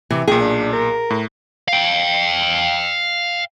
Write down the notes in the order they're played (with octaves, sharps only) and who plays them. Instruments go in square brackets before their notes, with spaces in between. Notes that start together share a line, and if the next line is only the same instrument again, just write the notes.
[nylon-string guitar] C3 [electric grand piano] E3
[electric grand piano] B1 A#2 [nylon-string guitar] G#4 [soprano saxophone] G5
[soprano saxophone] D4
A#4
[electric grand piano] A2
[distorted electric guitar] F5 G5